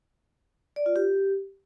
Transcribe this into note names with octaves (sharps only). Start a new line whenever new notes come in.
D5
F4
G4